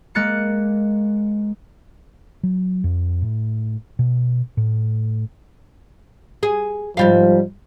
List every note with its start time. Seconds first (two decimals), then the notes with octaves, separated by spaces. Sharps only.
0.15 G#3 A#3 F#6 A6 C#7
2.43 F#3
2.84 F2
3.22 A2
3.99 B2
4.57 A2
6.43 G#4
6.97 G#2 F3 G3 F5